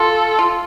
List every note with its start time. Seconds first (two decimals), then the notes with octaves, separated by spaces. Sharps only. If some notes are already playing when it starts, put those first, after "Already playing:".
Already playing: F4 A4
0.39 F4